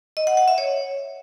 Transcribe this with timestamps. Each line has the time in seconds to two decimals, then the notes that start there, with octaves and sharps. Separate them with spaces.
0.17 D#5
0.27 F#5
0.37 F#5
0.48 E5
0.58 C#5